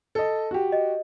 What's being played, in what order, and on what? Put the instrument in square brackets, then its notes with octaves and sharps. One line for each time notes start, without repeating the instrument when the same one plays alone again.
[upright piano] A4 D#5
F#4 G4
[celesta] D#5